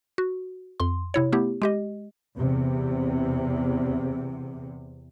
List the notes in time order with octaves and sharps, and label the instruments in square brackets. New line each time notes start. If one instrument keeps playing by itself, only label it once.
[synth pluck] F#4
F2 C6
C3 E4 C#5
A3 B3 E4 G4
G#3 G4 D#5
[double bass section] E2 C3